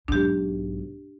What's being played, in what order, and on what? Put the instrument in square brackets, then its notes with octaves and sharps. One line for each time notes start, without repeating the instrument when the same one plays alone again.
[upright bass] B1 G#2 [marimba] D4 G4